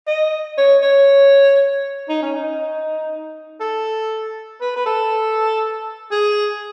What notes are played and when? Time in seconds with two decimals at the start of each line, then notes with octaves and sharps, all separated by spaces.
0.07 D#5
0.57 C#5
0.83 C#5
2.09 D#4
2.22 C#4
2.35 D#4
3.60 A4
4.60 B4
4.76 B4
4.86 A4
6.11 G#4